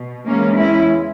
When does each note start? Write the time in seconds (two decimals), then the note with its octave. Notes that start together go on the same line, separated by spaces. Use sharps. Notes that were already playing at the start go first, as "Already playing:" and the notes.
Already playing: B2
0.26 E2 C#3 G#3 A#3 C#4
0.56 C#4 E4